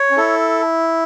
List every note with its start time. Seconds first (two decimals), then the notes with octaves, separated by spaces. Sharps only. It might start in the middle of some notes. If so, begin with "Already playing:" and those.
Already playing: C#5
0.11 C#4
0.17 E4 A4